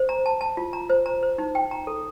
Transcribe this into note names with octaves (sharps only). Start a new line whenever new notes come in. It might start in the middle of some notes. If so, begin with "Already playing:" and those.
Already playing: C5
A#5
A5
A5
F4
A#5
C5
A#5
C5
D#4
G5
A#5
A4